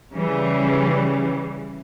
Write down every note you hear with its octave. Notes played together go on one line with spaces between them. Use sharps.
C#3 E3 G3